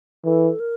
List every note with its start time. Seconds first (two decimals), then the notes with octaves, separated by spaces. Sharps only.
0.25 E3 A4
0.60 A#4